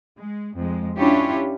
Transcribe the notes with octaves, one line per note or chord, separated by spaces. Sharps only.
G#3
F2 G#3
C#4 D4 E4 F4 G4 C#5